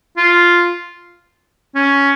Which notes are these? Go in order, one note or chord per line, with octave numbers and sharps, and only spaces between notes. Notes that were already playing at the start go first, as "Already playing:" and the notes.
F4
C#4